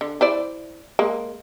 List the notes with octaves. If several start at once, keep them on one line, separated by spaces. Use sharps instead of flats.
D3
E4 C5 D5
G#3 A#3